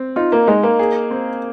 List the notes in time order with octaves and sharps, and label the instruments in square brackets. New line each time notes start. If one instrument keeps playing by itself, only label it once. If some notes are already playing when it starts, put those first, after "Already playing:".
Already playing: [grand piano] C4
[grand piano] D#4 [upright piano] F4
[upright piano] A#3
[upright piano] G#3 [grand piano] D#4
[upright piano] A#3
[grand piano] G#4
C4